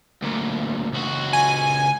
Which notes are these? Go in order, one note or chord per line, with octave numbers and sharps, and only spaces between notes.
D2 A#2
C#2 F#4
G#5